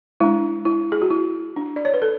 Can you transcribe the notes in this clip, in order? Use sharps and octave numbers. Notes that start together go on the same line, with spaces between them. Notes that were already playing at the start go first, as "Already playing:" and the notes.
G#3 D4 E4
E4
G#4
F#4
E4
D4
D5
C#5
B4
A4